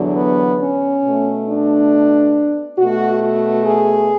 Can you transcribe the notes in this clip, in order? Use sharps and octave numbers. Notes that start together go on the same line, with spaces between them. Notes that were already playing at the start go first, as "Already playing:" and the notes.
Already playing: E2 D3 F#3
B3
C#4
B2 A3
D4
B2 A3 F#4
F#4
G#4